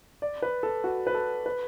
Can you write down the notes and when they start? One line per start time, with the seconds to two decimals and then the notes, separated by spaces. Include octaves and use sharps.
0.22 D5
0.42 B4
0.63 A4
0.84 F#4
1.07 B4
1.14 A4
1.46 B4